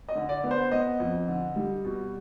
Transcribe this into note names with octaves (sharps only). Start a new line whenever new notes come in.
D#5
D3
D5
B3
C5
B3 D#5
F2
D3
G3
B2